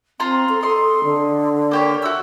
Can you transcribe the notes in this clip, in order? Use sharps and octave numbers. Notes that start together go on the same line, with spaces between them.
C4 F4 A#5 C6
A4
A4 D#5 C6
D3
A#3 G4 C#5
F#4 E5 E6